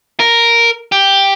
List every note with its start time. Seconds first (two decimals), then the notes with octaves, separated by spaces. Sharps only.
0.20 A#4
0.92 G4